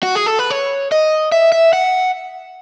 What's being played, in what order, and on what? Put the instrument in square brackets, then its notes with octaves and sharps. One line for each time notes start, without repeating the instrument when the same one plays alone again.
[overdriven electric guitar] F#4
G#4
A4
B4
C#5
D#5
E5
E5
F#5